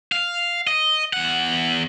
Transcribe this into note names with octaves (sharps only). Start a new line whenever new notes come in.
F5
D#5
E2 F#5